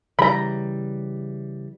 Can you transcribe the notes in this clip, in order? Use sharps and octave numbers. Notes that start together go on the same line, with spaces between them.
C#3 E3 G3 A#5 B5